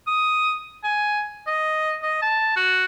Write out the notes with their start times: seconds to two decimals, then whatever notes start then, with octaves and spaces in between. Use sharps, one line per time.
0.07 D#6
0.84 G#5
1.47 D#5
2.02 D#5
2.22 A5
2.56 F#4